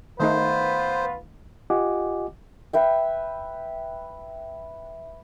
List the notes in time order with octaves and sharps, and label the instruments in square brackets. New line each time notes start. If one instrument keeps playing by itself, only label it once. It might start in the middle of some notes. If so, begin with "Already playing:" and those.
[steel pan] D#3 A3 D#4 [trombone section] B3 F4 B4 [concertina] C5
[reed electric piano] F4 G4 D#5 F#5 G#5 D6
[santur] B4 E5 G5